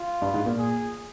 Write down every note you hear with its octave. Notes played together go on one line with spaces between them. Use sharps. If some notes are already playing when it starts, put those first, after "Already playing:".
Already playing: F4
G2
G#2
A#2
G#4